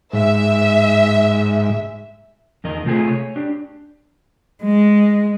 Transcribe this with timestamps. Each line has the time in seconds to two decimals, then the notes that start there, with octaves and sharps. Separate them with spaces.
0.13 G#2 E5
2.64 E2 D#3 A#4 D#5
2.85 C3 A3 F4 G#4 A4 G#5
3.08 C#5
3.36 D4 G4
4.63 G#3